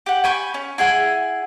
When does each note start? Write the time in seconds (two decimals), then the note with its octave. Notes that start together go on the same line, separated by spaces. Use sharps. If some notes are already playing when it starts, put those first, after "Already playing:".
0.06 G4 F#5
0.24 G5 G#5 B5 C#6
0.54 C#4
0.78 E4 G#4 F#5 G#5